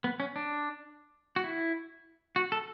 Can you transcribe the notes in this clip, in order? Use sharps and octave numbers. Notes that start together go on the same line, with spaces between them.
B3
C#4
D4
F#4
E4
F#4
A4